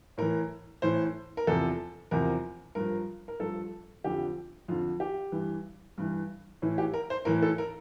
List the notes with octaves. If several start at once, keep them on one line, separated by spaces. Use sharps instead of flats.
A2 E3 A#4
A2 E3 C5
A#4
E2 C3 F3 A4
E2 C3 F3 A#4
G2 F3 A#4
A#4
G2 F3 A4
F2 D3 F3 G4
F2 D3 F3 F4
G4
G2 E3
G2 E3
A2 E3
G4
A#4
C5
A2 E3 A#4
A4
A#4